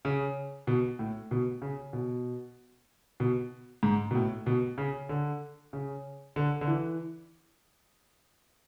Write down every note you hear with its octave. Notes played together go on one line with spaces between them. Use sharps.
C#3
B2
A2
B2
C#3
B2
B2
G#2
B2
A2
B2
C#3
D3
C#3
D3
D3
E3